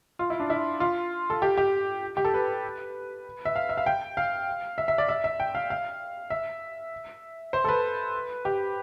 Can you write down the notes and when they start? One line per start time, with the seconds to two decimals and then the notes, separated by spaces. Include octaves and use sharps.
0.19 F4
0.30 E4
0.40 D4
0.50 E4
0.80 F4
1.30 A4
1.42 G4
1.57 G4
2.17 G4
2.25 A4
2.34 B4
3.45 E5
3.56 F5
3.69 E5
3.77 F5
3.86 G5
4.17 F5
4.78 E5
4.88 E5
4.98 D5
5.09 E5
5.24 E5
5.40 G5
5.55 F5
5.70 F5
6.30 E5
7.53 C5
7.64 A4
7.69 B4
8.45 G4